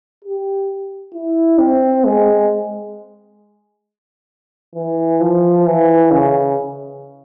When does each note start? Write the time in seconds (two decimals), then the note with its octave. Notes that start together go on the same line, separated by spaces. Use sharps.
0.24 G4
1.14 E4
1.59 C4
2.05 G#3
4.75 E3
5.20 F3
5.66 E3
6.11 C#3